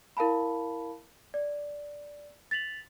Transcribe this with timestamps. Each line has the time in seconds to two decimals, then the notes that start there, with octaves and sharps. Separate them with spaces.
0.17 E4 A#4 F5 A5 B5
1.34 D5
2.51 A6 B6 F7 F#7